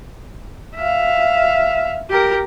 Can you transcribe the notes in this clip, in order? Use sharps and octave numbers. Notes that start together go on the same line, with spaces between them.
E5 F5
G4 A#4